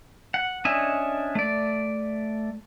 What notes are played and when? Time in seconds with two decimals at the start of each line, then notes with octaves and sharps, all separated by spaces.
0.34 F#5
0.65 C#4 D4 D#5 E5 G#5
1.35 A3 D5